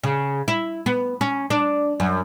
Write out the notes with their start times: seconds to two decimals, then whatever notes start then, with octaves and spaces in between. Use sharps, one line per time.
0.03 C#3
0.48 E4
0.86 B3
1.21 C#4
1.50 D4
2.00 F#2